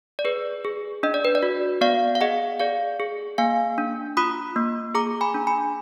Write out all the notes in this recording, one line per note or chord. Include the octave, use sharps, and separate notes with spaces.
D5
G#4 B4
G#4
D4 D#5
D5
B4
D5
F#4
B3 D5 F5
F5
G#4 D#5 F#5
G#4 D5 F5
G#4
A#3 F5 G#5
D4
F4 B5 D#6
A#3
G#4 A#5 D6
G#5 B5
D4
G#5 B5